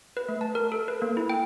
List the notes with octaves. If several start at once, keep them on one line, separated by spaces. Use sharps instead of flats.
B4
A3
A5
A#4
A4
B4
A#3
E4
G5